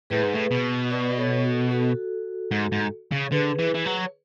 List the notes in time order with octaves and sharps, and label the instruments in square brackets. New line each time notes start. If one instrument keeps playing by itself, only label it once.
[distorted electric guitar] A2 [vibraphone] G#4 B4
[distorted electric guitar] G#2
A2
B2
[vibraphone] B4 D5
A4 C#5
F#4 A4
F#4 A4
[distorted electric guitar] G#2
G#2
C#3
[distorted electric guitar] D3 [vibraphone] G#4 B4
[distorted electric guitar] E3
E3
F#3